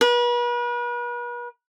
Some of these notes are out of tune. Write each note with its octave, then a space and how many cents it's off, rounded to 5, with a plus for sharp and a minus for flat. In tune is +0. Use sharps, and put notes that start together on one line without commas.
B4 -40